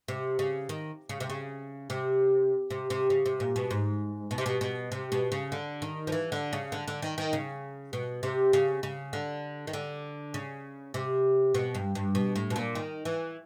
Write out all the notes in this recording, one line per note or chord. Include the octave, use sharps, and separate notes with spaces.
C3
C#3
D#3
C#3
C3
C#3
C3
C3
C3
C#3
C3
A#2
B2
G#2
B2
C3
B2
B2
C3
B2
C#3
D3
D#3
F3
E3
D3
C#3
D3
D3
D#3
D#3
C#3
B2
C3
C#3
C#3
D3
D#3
D3
C#3
C3
B2
G2
G2
B2
A2
B2
A#2
D#3
E3